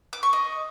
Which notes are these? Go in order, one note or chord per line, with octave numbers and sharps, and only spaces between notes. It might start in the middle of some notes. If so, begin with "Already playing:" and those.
D6
C#6
D#5